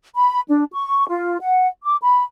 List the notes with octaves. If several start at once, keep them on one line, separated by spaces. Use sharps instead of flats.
B5
D4
C#6
F4
F#5
D6
B5